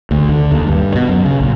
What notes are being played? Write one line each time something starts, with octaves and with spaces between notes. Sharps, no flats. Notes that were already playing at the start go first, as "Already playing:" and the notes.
D2
D3
D#2
G2
B2
F#2
C#3
A#1